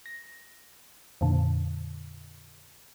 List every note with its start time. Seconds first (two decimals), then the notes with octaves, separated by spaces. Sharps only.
0.06 A#6
1.21 F2 A#2 D3